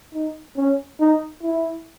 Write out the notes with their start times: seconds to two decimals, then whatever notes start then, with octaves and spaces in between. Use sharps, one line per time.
0.14 D#4
0.56 C#4
1.00 D#4
1.43 E4